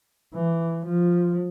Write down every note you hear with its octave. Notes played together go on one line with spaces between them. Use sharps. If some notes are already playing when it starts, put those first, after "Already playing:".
E3
F3